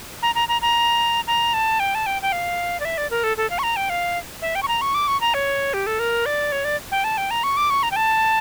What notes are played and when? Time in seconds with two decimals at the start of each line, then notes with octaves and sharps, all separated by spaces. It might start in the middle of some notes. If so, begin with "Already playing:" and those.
0.22 A#5
0.35 A#5
0.48 A#5
0.62 A#5
1.27 A#5
1.54 A5
1.80 G5
1.95 A5
2.06 G5
2.22 G5
2.32 F5
2.80 D5
2.85 E5
2.98 D5
3.11 A#4
3.24 A4
3.37 A4
3.50 F5
3.59 C#6
3.63 A#5
3.76 G5
3.90 F5
4.42 E5
4.55 G5
4.63 C#6
4.68 A#5
4.81 C#6
4.95 D6
5.08 C#6
5.21 A#5
5.34 C#5
5.74 G4
5.87 A4
5.99 A#4
6.26 D5
6.52 C#5
6.65 D5
6.92 G5
7.04 A5
7.18 G5
7.31 A#5
7.44 C#6
7.57 D6
7.70 C#6
7.83 A#5
7.91 G5
7.96 A5